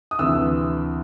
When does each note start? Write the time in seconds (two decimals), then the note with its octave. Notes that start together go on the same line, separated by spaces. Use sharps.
0.11 D#6
0.19 D2 C3 E3 E6